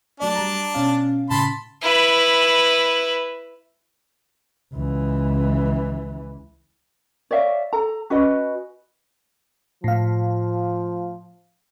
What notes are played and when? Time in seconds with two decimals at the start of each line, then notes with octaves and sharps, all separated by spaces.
0.20 F#3 A3 D4 D5 A5
0.36 G3 A#5
0.74 B2 C#4 F5
1.31 A2 C#3 A5 B5 C6
1.82 E4 B4
4.74 C#2 E3
7.31 C#5 D5 E5 F5
7.73 A4 A#5
8.10 C#4 F#4 B4 D#5
9.84 A2 F3 F5